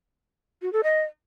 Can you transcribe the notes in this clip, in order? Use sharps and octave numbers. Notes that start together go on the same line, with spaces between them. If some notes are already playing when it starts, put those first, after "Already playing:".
F#4
A4
D#5